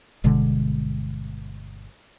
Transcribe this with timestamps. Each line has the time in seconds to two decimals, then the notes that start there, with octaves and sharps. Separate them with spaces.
0.24 G1 B2 D3 G#3